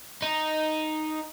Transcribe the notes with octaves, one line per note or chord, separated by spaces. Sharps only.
D#4